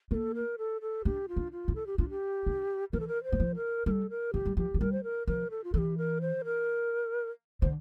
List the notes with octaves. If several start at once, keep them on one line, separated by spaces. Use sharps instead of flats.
A#3 A4 A#4
A#4
A4
A4
D4 G4
F4
D4
F4
E4
A4
G4
D4 F4
G4
D4
E3 A#4
A4
A#4
C5
G3
F3
A#4
G3 A4 A#4
A#4
F3 G4
G3
F3 G4
F3
G3 A#4
C5
A#4
F3 A#4
A4
F4
E3 G4 A4
A#4
C5
A#4
D3 C5